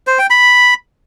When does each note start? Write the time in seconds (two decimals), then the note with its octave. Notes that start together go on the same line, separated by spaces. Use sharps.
0.07 C5
0.19 G5
0.30 B5